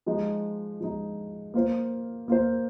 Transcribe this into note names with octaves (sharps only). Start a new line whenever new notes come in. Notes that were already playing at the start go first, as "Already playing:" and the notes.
F3 G#3 D#4
F3 G#3 D#4
A#3 F4 C5
A#3 F4 C5